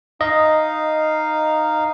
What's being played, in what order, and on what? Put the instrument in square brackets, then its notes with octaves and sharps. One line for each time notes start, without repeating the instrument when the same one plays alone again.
[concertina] D#4 F5 [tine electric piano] D#5